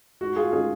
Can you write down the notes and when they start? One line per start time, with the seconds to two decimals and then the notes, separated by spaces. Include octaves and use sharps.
0.21 G#2 F#4
0.36 F4 G#4
0.52 D#3 G#3 C#4 F4 G#4